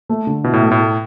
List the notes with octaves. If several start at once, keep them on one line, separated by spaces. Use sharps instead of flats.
A3
D3
B2 E4
A2
A3
A2
A4